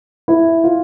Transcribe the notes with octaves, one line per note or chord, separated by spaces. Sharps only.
E4
F4